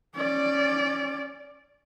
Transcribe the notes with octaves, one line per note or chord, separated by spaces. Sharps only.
C#4 D5